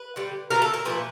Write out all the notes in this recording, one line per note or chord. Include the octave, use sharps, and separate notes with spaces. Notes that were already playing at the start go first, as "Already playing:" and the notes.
Already playing: B4
D3 G3
D3 F#3 A3 A#4
A4
A#4
A#2 F3 A3 B4